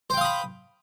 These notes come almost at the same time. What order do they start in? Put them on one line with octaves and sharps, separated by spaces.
C5 G5 F5 D#6 B5